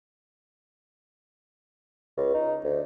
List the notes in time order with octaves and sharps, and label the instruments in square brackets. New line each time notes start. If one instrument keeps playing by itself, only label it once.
[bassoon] C#2
D#4
D2